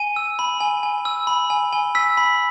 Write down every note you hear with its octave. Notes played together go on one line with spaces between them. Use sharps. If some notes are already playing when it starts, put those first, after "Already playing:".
Already playing: G#5 D#7
E6
B5
G#5
G#5
E6
B5
G#5
G#5
E6 B6
B5